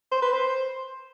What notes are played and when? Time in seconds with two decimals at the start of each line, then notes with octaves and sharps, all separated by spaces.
0.12 C5
0.22 B4
0.32 C5